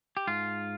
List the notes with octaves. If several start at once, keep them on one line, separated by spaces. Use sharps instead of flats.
G4
G#2 F4